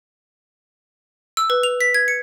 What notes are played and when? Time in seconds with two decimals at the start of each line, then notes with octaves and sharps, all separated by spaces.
1.37 E6
1.50 B4
1.63 F7
1.81 B6
1.94 G#6
2.08 C#7